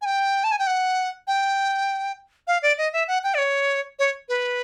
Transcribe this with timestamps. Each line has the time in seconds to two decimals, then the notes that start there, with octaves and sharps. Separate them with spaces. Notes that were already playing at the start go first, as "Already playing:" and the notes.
0.02 G#5
0.06 G5
0.44 A5
0.52 G#5
0.59 G5
0.67 F#5
1.27 G5
2.47 F5
2.62 D5
2.78 D#5
2.93 E5
3.08 F#5
3.24 G5
3.34 D5
3.38 C#5
3.99 C#5
4.29 B4